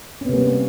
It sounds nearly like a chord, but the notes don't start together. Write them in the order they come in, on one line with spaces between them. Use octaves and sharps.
C#4 B3 C3 A#3 G3